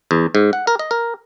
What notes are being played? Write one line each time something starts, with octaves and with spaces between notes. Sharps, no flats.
E2
G#2
F#5
A#4
D#5
A#4